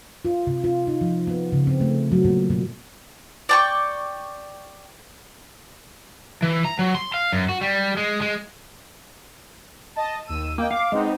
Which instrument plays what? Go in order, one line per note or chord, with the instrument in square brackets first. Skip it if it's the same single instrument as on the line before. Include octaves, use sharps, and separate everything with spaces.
[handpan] F4
C3
F4
D#4
F3
B3
C#3
C4
A3
F#3
A#2
B2
[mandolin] D5 G5 C#6
[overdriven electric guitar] E3
A#5
F#3
C6
F5
F#2
F#4
G3
G#3
G#3
[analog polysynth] D#5 A5
D#2 E6 D#7
[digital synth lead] A#3 [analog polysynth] D#5 G5
[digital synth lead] F5 [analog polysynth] D6
[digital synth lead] G#3 [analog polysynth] B3 C4 D#4